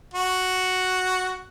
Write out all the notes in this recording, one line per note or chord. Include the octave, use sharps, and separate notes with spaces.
F#4